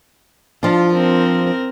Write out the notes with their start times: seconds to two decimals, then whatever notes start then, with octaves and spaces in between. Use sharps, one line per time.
0.63 F3 D4 F4
0.92 C4 A#4